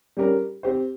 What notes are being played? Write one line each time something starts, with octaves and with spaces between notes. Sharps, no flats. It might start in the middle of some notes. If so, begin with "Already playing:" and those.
G3 C#4 G4 A#4
C4 G4 C5